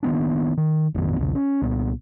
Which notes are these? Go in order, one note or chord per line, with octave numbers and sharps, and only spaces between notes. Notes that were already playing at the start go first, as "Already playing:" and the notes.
D#3 A#3 B3 D4
D#3
A1 F2 D#3 B3
B1 E2 C#3
C#4
C2 A#2 A#3 B3